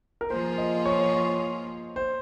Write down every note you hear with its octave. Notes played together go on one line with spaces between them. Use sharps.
A#4
F3 A#3 F4 G#4 C5
D#5
C#5
C#5
C5